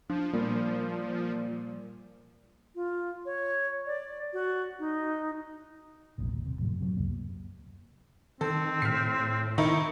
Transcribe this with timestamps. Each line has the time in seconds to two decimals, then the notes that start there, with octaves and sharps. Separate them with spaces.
0.10 F3 D4
0.33 A#2 G3
2.75 F4
3.26 C#5
3.86 D5
4.33 F#4
4.79 D#4
6.18 E1 A#1 G2 A#2
6.33 D#2
6.46 C3
6.59 F#2 A2 F3
6.80 C3 F#3
6.97 C#2 F#2 A#3
8.41 D#3 C4 A4
8.82 A2 F6 B6 C7
9.58 D#3 D#4 E4 C#6